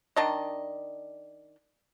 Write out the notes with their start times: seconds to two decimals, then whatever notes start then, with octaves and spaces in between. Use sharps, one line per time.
0.16 D#3 D4 D#5